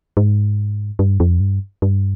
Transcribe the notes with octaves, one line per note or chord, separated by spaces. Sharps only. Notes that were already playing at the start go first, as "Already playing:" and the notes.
G#2
G2
F2
G2
G2